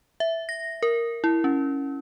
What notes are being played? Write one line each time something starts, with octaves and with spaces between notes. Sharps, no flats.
E5
A#6
A#4
E4
C#4